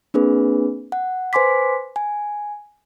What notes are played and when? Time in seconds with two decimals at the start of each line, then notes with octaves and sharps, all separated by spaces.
0.14 A#3 C4 D4 G#4 B4
0.92 F#5
1.33 B4 C5 G#5 C6 D6 B6
1.96 G#5